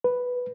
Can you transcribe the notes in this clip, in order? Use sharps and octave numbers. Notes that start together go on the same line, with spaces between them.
B4